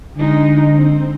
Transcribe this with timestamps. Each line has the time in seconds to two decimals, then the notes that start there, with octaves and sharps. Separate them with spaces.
0.17 D3 G#3 D#4
0.74 C4